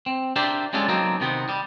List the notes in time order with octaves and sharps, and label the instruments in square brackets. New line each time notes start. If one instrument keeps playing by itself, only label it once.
[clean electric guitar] C4
D4 G4 A#4 C5 D5 E5
G3 G#3 C#4 D4 F4 A4
F#3 A#3 C4 D#4 A4
C3 D#3 B3 C4
G3